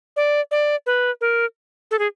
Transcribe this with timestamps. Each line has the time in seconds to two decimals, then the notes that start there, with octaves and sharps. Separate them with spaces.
0.16 D5
0.51 D5
0.86 B4
1.21 A#4
1.91 A4
1.99 G#4